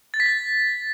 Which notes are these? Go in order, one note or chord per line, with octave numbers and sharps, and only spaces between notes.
A6
B6
A6